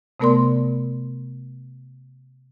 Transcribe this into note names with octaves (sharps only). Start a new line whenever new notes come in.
C3 A3 B3 A#4 D5 C6